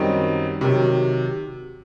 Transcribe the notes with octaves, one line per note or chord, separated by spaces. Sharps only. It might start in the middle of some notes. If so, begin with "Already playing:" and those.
Already playing: F#2 D#3 G3 C4 D#4
C3 D#3 F#3